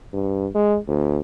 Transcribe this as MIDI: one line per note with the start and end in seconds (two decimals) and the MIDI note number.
0.13 0.48 43
0.55 0.77 56
0.88 1.20 38